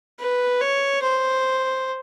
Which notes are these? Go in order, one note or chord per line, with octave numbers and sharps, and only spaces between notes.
B4
C#5
C5